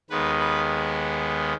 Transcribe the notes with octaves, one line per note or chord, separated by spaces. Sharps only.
D#2 D#3 G#3 B3 B4
B4